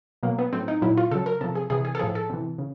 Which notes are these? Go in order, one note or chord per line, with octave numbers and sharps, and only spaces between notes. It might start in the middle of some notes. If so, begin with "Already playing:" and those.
B2 F#3 A#3
B3
A2 F#3 C4
D#4
A#2 F#3 E4
F4
C#3 F#3 A4
A#4
C3 F3 A4
G#4
C3 E3 G#4
G#4
A4
A2 F3 G#4
A4
C3 E3
C#3